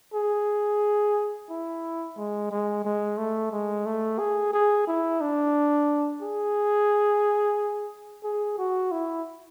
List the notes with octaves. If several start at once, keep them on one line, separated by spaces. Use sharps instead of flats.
G#4
E4
G#3
G#3
G#3
A3
G#3
A3
G#4
G#4
E4
D4
G#4
G#4
F#4
E4